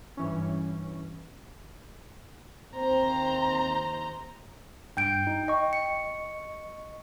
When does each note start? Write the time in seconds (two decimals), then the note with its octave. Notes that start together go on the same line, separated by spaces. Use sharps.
0.17 G2 E3 C#4
2.75 D#2 C4 C5 A#5
4.97 G2 G5 G6 D7
5.27 D#4
5.48 D#5 G5 C#6
5.73 C#7